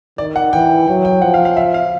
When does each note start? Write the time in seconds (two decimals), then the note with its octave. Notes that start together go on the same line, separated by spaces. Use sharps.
0.18 D#3 D5
0.36 F#5
0.53 E3 G5
0.88 F#3 G5
1.05 G5
1.22 F3 F#5
1.34 F5
1.45 F5
1.57 E5
1.74 F5